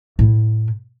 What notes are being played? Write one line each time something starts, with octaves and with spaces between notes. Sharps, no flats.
A2 E4